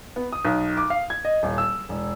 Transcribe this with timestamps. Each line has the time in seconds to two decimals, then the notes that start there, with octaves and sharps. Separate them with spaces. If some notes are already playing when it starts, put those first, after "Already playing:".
0.16 B3
0.33 D#6
0.45 B1
0.77 D6
0.90 F5
1.10 G#6
1.25 D#5
1.43 D#1
1.58 E6
1.89 E1